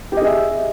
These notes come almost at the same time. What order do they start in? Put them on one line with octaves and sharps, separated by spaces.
G4 D#5 G#4 E5